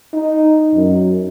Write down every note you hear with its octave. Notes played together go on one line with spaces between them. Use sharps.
D#4
F#2